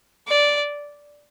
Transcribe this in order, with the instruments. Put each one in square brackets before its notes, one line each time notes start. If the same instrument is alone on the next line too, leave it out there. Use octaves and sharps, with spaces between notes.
[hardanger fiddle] D5